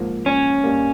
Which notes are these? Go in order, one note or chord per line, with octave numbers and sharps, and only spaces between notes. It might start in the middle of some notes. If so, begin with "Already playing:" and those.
Already playing: G#2 F3 A#3
C#4
G2 G3 A#3